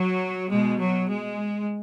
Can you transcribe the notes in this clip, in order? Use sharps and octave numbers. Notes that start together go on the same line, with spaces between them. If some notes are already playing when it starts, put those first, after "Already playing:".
Already playing: F#3
B2 G#3
F#3
G#3